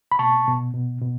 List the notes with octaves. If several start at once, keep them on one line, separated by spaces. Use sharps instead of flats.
B5
B2 A5 C#6
B2
B2
B2